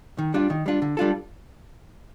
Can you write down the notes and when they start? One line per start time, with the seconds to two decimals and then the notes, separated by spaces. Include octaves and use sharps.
0.18 D#3
0.34 G3 D4 F4
0.50 D#3
0.66 G3 D4 F4
0.82 D3
0.97 G3 D4 F4 A4